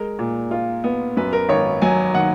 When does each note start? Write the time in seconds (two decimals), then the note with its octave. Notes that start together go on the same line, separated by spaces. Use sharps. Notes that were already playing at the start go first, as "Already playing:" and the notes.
Already playing: G#3 A#4
0.19 A#2
0.51 F4
0.84 B3
1.17 F#2 B4
1.33 A#4
1.49 G#1 C#5
1.82 F#3 G#5
2.15 D#3 F#5